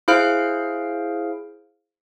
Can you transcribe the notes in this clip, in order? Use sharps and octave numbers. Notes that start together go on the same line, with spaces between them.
E4 G#4 C5 F5 F6 D7